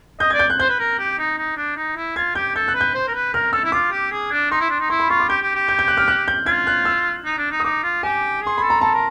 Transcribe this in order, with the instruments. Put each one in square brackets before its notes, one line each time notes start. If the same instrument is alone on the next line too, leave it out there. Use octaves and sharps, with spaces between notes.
[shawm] D#5 [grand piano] G6
[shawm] D5 [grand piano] G#6
[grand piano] G6
F#6
[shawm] C5 [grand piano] G6
[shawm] B4
A#4
G4
D#4
D#4
D4
D#4
E4
[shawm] F4 [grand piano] G#6
[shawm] G4 [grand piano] G6
[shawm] A4 [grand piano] G6
[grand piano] F#6
[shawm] B4
[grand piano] G6
[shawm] C5
A#4
B4
[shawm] A#4 [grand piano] F6
[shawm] A4 [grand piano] E6
[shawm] E4
[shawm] F4 [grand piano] D6
[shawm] G4
G#4
D4
[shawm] D#4 [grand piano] C6
[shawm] E4
D4
D#4
[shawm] E4 [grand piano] C6
[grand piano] B5
[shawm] F4 [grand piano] C#6
[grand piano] D6
[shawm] G4 [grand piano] G6
[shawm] G4
G4
[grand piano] G6
G6
F#6
F6
F#6
G6
[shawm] F4 [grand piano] G#6
[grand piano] F#6
E6
[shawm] D#4
D4
D#4
[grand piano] D#6
[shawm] D#4 [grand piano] D6
[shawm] F4
[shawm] G4 [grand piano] G#5
[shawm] G#4 [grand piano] C6
[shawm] A4 [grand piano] B5
[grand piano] A#5
[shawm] A4 [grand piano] A5
[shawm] A#4